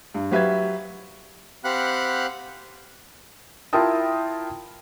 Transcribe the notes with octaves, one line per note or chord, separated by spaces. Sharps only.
G2
F#3 G4 B4 E5 F5 G#6
C4 G4 F5 F#5 B5 F#6
E4 F4 A#4 G5 A5 D#6